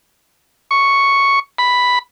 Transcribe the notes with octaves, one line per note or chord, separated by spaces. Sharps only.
C#6
B5